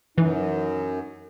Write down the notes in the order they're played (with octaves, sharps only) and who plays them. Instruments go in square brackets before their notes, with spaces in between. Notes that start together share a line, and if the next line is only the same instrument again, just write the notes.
[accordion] F#2 [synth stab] E3 [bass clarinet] D#4